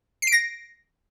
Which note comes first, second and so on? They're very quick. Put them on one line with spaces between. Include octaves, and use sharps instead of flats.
C7 D7 A#6